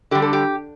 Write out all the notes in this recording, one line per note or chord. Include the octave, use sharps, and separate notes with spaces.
D3 G3 G4
A4
G4